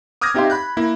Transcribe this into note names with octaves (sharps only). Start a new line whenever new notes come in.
D6 D#6 F6 G6 G#6 A#6
C4 D#4 G4 E5 F5 C6
B5 F#6 G6
A#3 E4